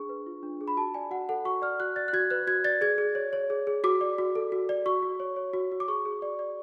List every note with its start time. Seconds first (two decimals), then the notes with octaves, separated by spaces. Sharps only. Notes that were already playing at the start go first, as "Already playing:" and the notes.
Already playing: D4 G#4 C#6
0.09 B4
0.26 F4
0.43 D4
0.61 G#4
0.68 B5
0.77 F#4 A5
0.94 D5 G#5
1.11 F#4 F#5
1.29 A4 F#5
1.45 F#4 C#6
1.62 D5 F6
1.80 F#4 F#6
1.96 D5 A6
2.08 F#6
2.13 F#4 G#6
2.30 B4 F#6
2.47 F#4 G#6
2.64 D5 A6
2.81 G#4 G#6
2.98 G#4
3.15 C#5
3.33 C#5
3.50 G#4
3.67 G#4
3.84 F#4 D6
4.01 D5
4.18 F#4
4.35 A4
4.52 F#4
4.69 D5
4.86 F#4 C#6
5.02 F#4
5.20 C#5
5.36 C#5
5.54 F#4
5.72 F#4
5.80 D6
5.88 G#4 C#6
6.05 G#4
6.22 D5
6.39 D5